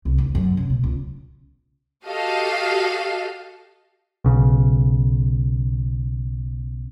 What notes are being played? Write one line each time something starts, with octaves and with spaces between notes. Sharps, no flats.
C2
D2
F#2
C#3
B2
C#2
F#4 G4 A4 D#5 F5
B1 C#3